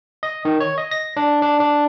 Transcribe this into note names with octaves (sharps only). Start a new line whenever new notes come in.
D#5
D#3
C#5
D#5
A#6
D4
D4
D4